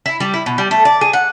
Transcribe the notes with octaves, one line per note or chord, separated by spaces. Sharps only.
E4
G3
E4
B2
G3
A3
D5
G#4
F#5